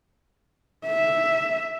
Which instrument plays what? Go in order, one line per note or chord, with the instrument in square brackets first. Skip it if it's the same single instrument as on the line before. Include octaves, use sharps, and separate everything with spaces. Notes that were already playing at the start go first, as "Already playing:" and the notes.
[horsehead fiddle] E5